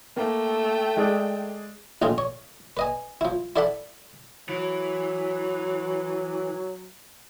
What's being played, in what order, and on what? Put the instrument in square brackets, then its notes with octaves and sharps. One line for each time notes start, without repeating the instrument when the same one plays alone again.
[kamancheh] A3 G5 [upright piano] A#3
[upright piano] G#3 G#4 D5
[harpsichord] A#1 A2 D#3 F4 G#4
C#5
B4 D#5 G#5
F3 E4
E4 A4 D5 E5 F#5 B5
[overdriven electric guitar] E3 [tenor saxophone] F#3